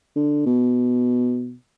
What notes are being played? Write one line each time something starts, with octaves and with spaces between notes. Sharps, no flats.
D3
B2